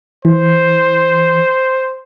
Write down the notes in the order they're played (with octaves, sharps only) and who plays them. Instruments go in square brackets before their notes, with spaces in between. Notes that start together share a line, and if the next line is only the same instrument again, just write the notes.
[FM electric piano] E3 [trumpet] C5